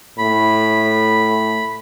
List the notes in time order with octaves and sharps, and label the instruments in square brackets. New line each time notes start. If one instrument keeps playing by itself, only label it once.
[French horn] A2 [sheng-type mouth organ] B5